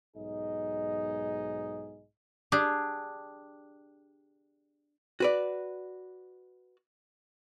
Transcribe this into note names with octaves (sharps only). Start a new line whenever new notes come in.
B1 G#2 D#4 G#4 D#5
D4 G4 G#4
F#4 B4 D5